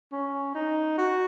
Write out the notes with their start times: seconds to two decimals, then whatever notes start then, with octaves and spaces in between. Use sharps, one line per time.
0.13 C#4
0.55 D#4
0.98 F#4